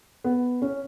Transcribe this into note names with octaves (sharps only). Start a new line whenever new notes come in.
B3
C#4